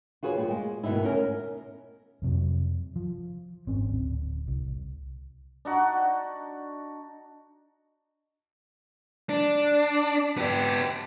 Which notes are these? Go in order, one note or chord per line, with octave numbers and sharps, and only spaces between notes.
F4 F#4 G#4 B4 C#5
A#2 G3
G#3
G#2 B2 D#3 D#4 E4
B3 C#4 A#4
F2 C3 F#3
F3
G#1 C4 C#4
D1
C2
D4 D#4 F#4
D4
B3 G4